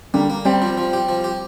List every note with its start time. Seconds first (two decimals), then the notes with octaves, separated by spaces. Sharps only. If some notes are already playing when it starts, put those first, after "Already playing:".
0.14 D3 G3 A#3
0.30 A#3
0.45 G3 C4 G4
0.62 F3
0.78 F3
0.93 G4
1.09 F3
1.24 G4